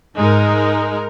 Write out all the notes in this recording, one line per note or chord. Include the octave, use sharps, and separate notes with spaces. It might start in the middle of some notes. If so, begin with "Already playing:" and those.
G#2 G#3 D#4 A#4